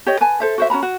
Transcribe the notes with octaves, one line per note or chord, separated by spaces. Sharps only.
G4 C#5 D#5
B4 G#5 A5
A4 C5 E5
F#4 C5 E5
C#4 F#4 A#5 B5
F#4